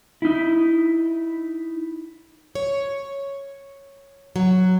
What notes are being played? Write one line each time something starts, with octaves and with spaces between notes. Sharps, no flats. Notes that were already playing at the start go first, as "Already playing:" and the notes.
D#4 E4
C#5
F#3